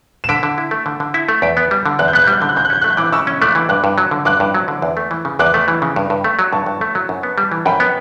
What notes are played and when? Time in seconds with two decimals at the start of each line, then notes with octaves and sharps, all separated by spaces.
0.24 E7
0.29 D3 B6 D7
0.43 D3
0.58 E4
0.71 A3
0.86 D3
1.00 D3
1.14 E4
1.29 A3
1.42 E2 B6 D7
1.57 B3
1.71 G3
1.86 D3
1.99 E2 F#6
2.08 G6
2.13 B3 F#6
2.24 G6
2.27 G3
2.33 F#6
2.41 D3 G6
2.49 F#6
2.56 C#3 G6
2.65 F#6
2.70 C#4 G6
2.82 A3 F#6
2.90 G6
2.97 E3 D6 F#6
3.12 C#3 C#6 E6
3.27 C#4
3.42 A3 D6 F#6
3.55 E3
3.69 G2 D6 F#6
3.84 G2
3.98 F#3
4.11 D3
4.25 G2 D6 F#6
4.40 G2
4.54 F#3
4.68 D3
4.82 E2
4.97 A3
5.11 E3
5.25 C#3
5.39 E2 D6 F#6
5.54 A3
5.68 E3
5.82 C#3
5.96 G2
6.10 G2
6.24 A3
6.39 F#3
6.52 G2 A5 C#6
6.66 G2
6.81 A3
6.95 F#3
7.09 F#2
7.23 B3
7.38 G3
7.52 E3
7.65 F#2 G5 B5
7.80 B3